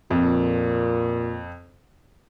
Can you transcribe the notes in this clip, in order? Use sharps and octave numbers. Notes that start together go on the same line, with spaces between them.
F2 A#2